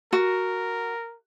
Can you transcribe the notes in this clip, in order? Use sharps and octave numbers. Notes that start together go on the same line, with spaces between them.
F#4 A#4